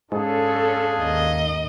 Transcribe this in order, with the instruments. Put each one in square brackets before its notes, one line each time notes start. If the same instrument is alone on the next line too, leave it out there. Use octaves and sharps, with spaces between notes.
[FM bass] G#2 [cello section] C#4 A4 [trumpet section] D4 F4 G#4
[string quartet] D#2 D#5